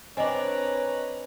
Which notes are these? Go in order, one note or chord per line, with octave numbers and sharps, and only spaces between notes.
C4 D4 B4 C#5 D#5 G#5 A#5